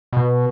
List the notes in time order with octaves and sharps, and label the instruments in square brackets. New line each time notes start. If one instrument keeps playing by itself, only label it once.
[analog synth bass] B2